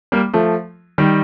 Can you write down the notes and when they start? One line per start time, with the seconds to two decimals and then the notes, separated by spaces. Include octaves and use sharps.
0.12 G3 A#3
0.33 F3 A3
0.98 D#3 G3